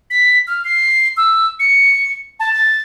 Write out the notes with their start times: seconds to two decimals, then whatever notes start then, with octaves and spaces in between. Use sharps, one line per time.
0.10 B6
0.47 F6
0.64 C7
1.17 E6
1.59 C#7
2.40 A5
2.53 A6